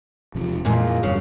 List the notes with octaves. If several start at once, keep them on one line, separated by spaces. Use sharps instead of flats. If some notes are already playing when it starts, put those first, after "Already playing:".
E1 C3 F3
F2 A#2 E3 F3 G#3
E2 G2 C#3 F#3